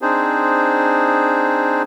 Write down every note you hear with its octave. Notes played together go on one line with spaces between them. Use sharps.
C4 D4 D#4 G#4 C5